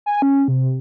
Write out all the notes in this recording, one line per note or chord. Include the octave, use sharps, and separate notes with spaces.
G#5
C#4
C3